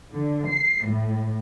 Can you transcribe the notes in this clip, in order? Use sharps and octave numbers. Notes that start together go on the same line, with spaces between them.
D3
C7
A2